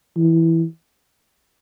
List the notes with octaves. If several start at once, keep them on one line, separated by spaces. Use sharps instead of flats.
E3